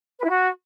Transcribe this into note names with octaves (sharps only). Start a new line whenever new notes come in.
B4
E4
F#4